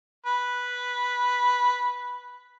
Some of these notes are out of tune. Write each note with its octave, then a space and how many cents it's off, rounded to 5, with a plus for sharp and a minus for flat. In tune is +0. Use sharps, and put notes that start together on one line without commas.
B4 -5